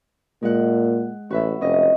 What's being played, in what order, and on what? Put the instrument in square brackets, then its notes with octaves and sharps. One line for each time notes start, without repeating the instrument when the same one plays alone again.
[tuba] A#2 [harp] G#3 F#5
[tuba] A1 [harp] F#4 B4 E5
[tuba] F1 [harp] C#4 D#5